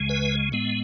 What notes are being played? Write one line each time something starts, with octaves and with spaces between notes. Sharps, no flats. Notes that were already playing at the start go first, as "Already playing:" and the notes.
Already playing: C#2 C#3 G#3
B4
A2 G#3 B3